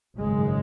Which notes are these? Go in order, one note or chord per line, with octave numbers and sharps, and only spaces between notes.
G#1 F#2 C#3 G#3